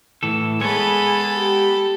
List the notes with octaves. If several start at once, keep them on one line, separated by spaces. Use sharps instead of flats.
A2 E3 A4
G#3 B3 G#4 A4 C#5 B5
G4